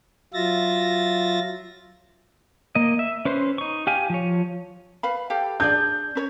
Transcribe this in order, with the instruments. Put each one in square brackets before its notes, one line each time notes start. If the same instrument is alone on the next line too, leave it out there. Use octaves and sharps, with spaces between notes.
[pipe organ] F#3 F4 E5 A6 A#6
[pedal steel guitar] A#3 D#5
E5
C#4 B4 C5 C6
D#4 C#6
G4 F5 G#5
F3 C#5
[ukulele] B4 F5 B5
G4 A4 F5
[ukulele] D4 G#4 D5 [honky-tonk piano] G6
[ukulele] C#4 A#4 C#5